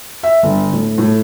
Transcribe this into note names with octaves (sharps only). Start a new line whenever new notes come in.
E5
G1
A2
A2